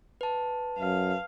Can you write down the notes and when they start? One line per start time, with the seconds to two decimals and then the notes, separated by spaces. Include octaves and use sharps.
0.21 B4 A5
0.79 F#2 F5